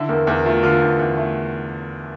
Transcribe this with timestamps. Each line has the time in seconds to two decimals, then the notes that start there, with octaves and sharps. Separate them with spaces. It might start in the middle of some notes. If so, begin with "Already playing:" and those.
Already playing: D3 E4
0.09 E2 A#3
0.27 E2 A#3
0.45 A3 F4
0.63 D3 F4
0.81 E2
0.99 E2
1.17 A3